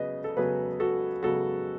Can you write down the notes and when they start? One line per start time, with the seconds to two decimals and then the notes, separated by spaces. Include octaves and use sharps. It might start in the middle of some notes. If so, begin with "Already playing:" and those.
Already playing: C#3 F#3 B3 B4 D#5
0.24 A4
0.37 C#3 F#3 B3 G#4 B4
0.80 F#4 A4
1.23 C#3 F#3 B3 F#4 A4